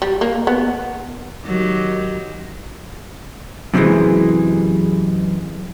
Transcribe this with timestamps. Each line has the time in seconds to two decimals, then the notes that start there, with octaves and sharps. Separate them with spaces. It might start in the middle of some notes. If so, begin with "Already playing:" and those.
0.02 G3
0.21 A#3
0.47 B3
1.44 D#3 F#3 G4
3.74 F#2 C3 D#3 E3 G#3